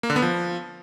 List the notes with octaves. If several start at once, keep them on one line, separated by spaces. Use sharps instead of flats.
A#3
D3
B3
F3